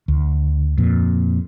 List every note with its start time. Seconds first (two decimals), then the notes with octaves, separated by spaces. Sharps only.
0.08 D2
0.78 F2 A#2